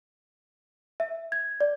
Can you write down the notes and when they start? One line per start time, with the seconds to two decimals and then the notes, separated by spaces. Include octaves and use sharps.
1.00 E5
1.32 G#6
1.61 D5